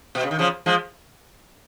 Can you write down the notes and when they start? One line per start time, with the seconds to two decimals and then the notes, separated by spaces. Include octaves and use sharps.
0.15 B2
0.23 C#3
0.31 D#3
0.39 C#3 F3
0.66 F3 G#3